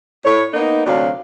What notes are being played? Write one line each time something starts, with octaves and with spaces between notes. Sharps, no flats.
A2 C#5
A#3 B3 D#4
D2 C3 F#3 D4 F5